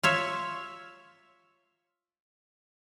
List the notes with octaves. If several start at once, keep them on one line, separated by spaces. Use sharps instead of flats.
F4 C#5 E5